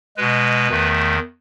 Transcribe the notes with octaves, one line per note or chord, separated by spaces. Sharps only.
B2 G#3 B4
E2 D#3 A3